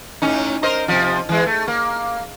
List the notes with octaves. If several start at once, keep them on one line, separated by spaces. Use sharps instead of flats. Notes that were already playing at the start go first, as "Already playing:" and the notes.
A2 C#4 D#4
A#4 C5 D#5
C3 F3
E3 G#3
A3
A#3